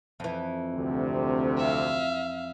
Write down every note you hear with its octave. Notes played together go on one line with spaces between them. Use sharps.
F2 E3
D2 C3
E5 F5